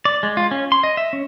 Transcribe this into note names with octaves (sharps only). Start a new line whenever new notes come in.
D5
G#3
F4
C#4
C6
D#5
E5
C#4